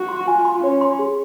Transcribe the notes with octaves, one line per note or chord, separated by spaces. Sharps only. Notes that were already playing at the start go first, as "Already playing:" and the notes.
Already playing: F#4
C6
F4 G#5
C6
C#4 C#5
C6
G#4